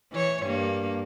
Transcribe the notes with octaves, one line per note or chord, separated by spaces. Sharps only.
E3 C#5
G2 A#3